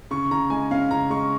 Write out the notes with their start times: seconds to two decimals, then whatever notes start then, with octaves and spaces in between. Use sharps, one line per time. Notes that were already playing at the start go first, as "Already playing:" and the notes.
0.11 C#3 C#6
0.31 C#3 A#5
0.50 G#3 G#5
0.71 C#4 F5
0.91 C#3 A#5
1.10 G#3 C#6